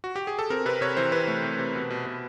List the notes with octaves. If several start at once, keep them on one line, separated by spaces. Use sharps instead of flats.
F#4
G4
G#4
A4
C4 A#4
C3 B4
C3 C#5
E3 C5
C3 B4
A3
C3
C3
B2
B2
B2